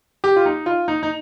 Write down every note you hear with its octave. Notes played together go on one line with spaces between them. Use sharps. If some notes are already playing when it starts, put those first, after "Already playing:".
G4
F4
D#4
F4
D#4
D#4